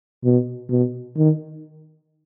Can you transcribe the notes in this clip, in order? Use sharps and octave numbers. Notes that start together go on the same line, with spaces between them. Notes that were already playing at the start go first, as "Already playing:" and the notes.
B2
B2
D#3